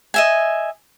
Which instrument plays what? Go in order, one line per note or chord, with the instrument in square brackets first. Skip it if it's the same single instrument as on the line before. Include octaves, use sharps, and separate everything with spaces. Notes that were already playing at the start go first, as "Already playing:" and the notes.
[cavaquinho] D#5 E5 G#5